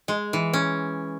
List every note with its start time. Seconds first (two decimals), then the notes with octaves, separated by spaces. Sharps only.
0.08 G#3
0.33 E3
0.53 C#4